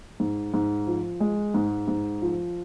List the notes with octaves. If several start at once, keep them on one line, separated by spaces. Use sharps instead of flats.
G#2
G#2
F3
G#3
G#2
G#2
F3